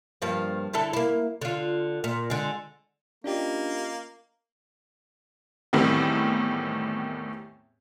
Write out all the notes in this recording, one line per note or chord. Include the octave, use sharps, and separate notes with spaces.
G2 F3 A#3
D3 E4 A4
A#3 E4
D3 F4
A#2
D3 G#3
A#3 C#4 D4 F4 G4 D#5
E2 A2 D#3 G3 B3 C4